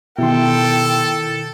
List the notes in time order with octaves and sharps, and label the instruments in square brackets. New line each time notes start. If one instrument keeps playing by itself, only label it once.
[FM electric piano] B2 G4 C6 [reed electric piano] D#3 E4 [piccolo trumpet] A4 [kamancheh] G5